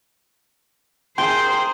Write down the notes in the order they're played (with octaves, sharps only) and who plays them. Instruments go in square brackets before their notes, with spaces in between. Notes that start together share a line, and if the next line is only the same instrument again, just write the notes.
[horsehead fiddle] G#4 A#4 [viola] C5 [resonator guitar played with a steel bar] G5 [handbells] C6